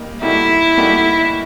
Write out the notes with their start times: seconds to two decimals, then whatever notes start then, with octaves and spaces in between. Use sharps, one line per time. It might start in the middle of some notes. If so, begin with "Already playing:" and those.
Already playing: G3 A#3 D#4
0.21 G3 A#3 D#4 E4 F#4 A4
0.77 G3 A#3 D#4 F#4 A4